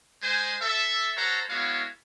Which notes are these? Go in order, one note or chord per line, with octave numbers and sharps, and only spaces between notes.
G#3 C5 G#5
A4 E5
F#4 A4 C5 C#5 F#5 A#5
G#3 B3 E4 F#4 C#5 F5